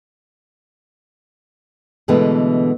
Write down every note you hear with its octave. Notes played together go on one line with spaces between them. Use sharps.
B2 D3 E3 G#3 A3 B3